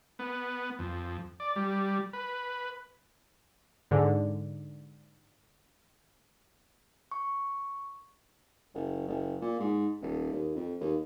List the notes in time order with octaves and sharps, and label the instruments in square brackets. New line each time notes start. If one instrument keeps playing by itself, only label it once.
[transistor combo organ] B3
F2
D5
G3
B4
[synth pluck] G#2 D3 G#3
[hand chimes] C#6
[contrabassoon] F#1
F#1
A#2
G#2
D#1
D#2
F2
D#2